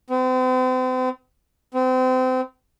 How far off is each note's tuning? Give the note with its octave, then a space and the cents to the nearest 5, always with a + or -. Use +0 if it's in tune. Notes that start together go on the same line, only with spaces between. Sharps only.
C4 -40
C4 -30